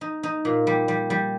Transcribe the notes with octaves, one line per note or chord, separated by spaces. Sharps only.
D#4
D#4
A#2
G3
G3
G3